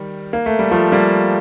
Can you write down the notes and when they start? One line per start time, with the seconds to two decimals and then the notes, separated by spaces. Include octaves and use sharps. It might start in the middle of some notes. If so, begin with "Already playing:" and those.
Already playing: D#3 G3
0.33 A#3
0.46 A3
0.59 G3
0.71 F3 A3
0.92 G3 A#3